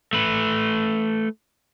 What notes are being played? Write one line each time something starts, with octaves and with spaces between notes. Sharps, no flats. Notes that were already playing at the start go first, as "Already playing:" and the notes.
A3 B4